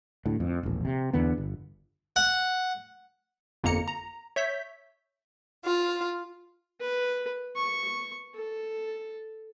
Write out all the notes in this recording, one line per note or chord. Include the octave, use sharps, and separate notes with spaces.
D2 A2
F2
E1 A#1
C3
E2 D3 B3
G1
F#5
G1 F2 A#3 A#5 C#7
A#5
C#5 E5 G6 B6
F4
B4
C#6
A4